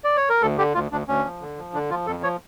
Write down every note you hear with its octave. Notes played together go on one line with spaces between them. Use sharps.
D5
C#5
A#4
D2 A4
D3 G4
D2 F4
D2 D4
D2 C#4
F3
D3
F3
D3 D4
F3 F4
F2 A4
F3 C#5